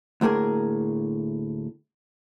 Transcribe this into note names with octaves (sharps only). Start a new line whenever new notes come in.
D2 A2 A#3 G#4 A#4